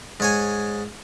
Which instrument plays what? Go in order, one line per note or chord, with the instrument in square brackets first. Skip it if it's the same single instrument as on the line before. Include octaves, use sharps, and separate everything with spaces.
[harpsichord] G#2 C#5 G#5